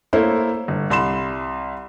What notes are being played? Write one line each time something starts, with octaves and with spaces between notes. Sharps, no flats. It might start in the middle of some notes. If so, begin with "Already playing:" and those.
A3 A#3 E4 C5 C#5
G1
C2 B5 C6 E7